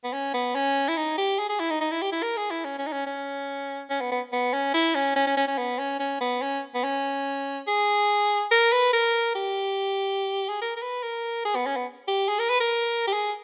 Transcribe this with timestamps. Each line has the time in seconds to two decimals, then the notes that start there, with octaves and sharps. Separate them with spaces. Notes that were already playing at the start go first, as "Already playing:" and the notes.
0.04 B3
0.13 C#4
0.34 B3
0.55 C#4
0.88 E4
0.97 D#4
1.18 G4
1.39 G#4
1.49 G#4
1.60 E4
1.70 D#4
1.81 D#4
1.91 E4
2.02 G4
2.12 E4
2.22 A#4
2.37 G#4
2.51 E4
2.64 C#4
2.78 C#4
2.87 D#4
2.92 C#4
3.06 C#4
3.90 C#4
4.01 B3
4.11 B3
4.32 B3
4.53 C#4
4.74 E4
4.95 C#4
5.16 C#4
5.27 C#4
5.37 C#4
5.48 C#4
5.58 B3
5.79 C#4
6.00 C#4
6.21 B3
6.42 C#4
6.74 B3
6.84 C#4
7.67 G#4
8.51 A#4
8.72 B4
8.93 A#4
9.35 G4
10.49 G#4
10.61 A#4
10.76 A#4
10.82 B4
11.03 A#4
11.45 G#4
11.55 B3
11.66 C#4
11.76 B3
12.08 G4
12.28 G#4
12.39 A#4
12.49 B4
12.60 A#4
13.07 G4
13.13 G#4